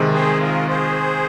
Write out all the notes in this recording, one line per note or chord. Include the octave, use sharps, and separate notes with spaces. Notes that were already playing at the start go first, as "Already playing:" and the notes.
Already playing: C3 D#3 G#3 C4
G#4 C5
F4 A#4
G#4 C5